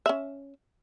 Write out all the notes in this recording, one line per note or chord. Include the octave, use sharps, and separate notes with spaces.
C#4 E5